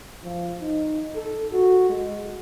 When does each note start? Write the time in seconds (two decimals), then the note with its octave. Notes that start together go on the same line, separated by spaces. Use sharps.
0.24 F3
0.62 D#4
1.15 A4
1.53 F#4
1.90 G#3